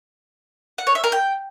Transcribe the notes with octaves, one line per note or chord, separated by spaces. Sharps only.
F#5
C#5
E5
A#4
G5